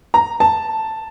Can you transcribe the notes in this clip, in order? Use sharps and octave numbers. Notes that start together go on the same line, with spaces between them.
A#5
A5